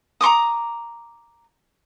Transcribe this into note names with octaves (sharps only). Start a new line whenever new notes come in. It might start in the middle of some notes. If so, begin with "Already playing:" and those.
A#5 C6 D6 D#6